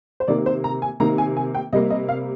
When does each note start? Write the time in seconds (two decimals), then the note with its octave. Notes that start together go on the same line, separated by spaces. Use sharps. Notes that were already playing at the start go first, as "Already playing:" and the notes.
0.20 C5
0.28 C3 D#3 A#3 D5
0.46 C5
0.64 A#5
0.82 G#5
1.00 C3 D#3 A#3 A#5
1.18 G#5
1.37 G#5
1.55 G5
1.73 C3 G3 A#3 D#5
1.90 D#5
2.09 F5